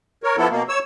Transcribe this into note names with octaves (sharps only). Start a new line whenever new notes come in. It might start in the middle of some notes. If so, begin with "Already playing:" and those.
A#4 C#5
F3 B3 E4 A4
B2 A#3
C#5 E6